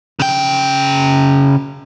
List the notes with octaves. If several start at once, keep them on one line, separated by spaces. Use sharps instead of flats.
C#3 G5